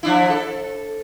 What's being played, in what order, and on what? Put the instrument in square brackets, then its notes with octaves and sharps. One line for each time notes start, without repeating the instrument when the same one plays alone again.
[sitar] F3 D4 E4
A4